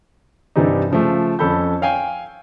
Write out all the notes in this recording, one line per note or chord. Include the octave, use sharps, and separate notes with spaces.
G2 C3 E3 G3 D4 D#4
C#3 F3 A3
F2 C#4 A4 B5 G6
C#5 F5 G5 G#5 C7